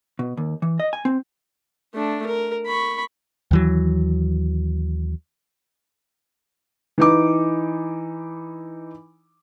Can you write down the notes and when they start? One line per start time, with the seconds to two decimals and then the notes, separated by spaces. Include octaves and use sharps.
0.19 B2
0.37 D#2
0.62 E3
0.80 D#5
0.93 G#5
1.05 C4
1.94 A3 D4
2.26 A#4
2.66 B5 C#6
3.51 D#2 E3 F#3
6.98 E3 D#4 D6